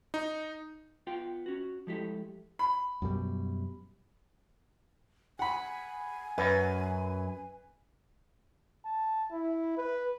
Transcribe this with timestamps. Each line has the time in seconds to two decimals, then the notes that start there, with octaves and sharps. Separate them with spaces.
0.14 D#4
1.07 B3 F4 G5
1.46 C#4 F#4
1.87 F3 G#3 A3 E4 G4 A4
2.59 B5
3.02 F#2 B2 G3
5.39 F#5 G#5 B5
6.38 F#2 B4
8.85 A5
9.31 E4
9.78 B4